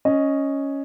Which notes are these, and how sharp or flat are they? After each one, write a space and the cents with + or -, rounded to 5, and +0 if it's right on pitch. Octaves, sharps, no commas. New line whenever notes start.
C#4 +0 D#5 +0